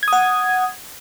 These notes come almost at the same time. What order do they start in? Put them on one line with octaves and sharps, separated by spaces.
G#6 D#6 F#5